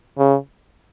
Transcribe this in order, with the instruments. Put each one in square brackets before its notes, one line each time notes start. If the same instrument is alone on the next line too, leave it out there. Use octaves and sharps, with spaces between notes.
[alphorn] C#3